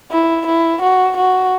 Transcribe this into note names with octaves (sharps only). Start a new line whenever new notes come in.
E4
E4
F#4
F#4